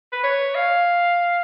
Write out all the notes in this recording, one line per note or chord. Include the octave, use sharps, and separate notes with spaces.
B4
C#5
F5